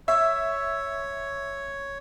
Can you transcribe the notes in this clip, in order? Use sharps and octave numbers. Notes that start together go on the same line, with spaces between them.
C#5 E5